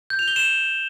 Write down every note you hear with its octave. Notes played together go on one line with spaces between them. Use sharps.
G6
F7
G7
E7